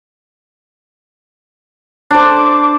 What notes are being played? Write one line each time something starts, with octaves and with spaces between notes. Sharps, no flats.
D4 C5 D6